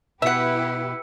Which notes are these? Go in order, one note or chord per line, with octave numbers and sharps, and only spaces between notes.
B2 E4 G4 B4 E5 F#5 E6 C#7